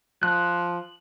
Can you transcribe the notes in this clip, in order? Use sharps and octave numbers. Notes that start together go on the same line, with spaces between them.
F3 F#6